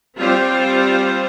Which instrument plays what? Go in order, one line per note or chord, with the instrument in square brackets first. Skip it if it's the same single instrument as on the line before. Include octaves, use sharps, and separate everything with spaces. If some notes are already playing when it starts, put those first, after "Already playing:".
[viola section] G3 C4 F4 C5